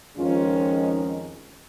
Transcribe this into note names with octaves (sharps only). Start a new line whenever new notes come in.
F2 D#3 G#3 C#4 F4
D#4